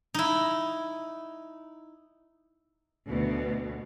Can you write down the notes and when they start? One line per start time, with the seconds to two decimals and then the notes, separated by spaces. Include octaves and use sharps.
0.14 D#4 E4
3.06 D2 B2